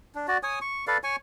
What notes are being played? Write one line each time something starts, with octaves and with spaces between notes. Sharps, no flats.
D4
F#4 D5
C#5 G#5 D#6
C#6
A4 B4 D5 F5
C#5 G#5 C#6